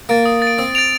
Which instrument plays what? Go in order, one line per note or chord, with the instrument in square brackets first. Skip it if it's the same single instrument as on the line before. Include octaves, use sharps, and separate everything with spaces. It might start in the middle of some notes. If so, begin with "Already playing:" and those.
[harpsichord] A#3 [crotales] A6 D7
[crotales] D#6
A6
D7
[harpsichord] C4 [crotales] D#6
[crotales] A6 D7 F7